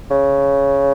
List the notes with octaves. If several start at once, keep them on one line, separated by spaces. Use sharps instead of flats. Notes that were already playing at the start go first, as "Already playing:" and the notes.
C#3